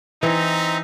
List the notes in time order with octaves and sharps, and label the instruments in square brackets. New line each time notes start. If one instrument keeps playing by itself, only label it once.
[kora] E3 [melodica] C4 E5 A#5 [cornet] D#4